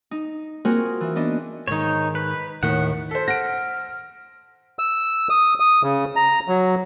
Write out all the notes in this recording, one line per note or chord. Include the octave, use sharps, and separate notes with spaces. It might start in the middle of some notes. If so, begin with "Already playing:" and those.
D#4
A#3 C4 F4 F#4 G#4 A#4
E3
B3 D4 D#5
G#2 D#3 D#4 C#5
B4
D#2 A2 D#3 F#5
A4 C5 B6
F#5 F6 A#6 D7
E6
D#6
D#6
C#3
A#5
F#3